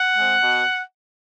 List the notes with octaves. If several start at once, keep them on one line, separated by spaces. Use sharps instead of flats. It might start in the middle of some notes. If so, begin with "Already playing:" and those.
Already playing: F#5
G#3 C4
B2